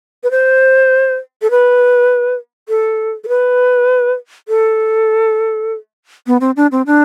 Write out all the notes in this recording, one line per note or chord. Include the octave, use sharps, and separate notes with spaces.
B4
C5
A4
B4
A4
A4
B4
A4
B3
C4
D4
C4
D4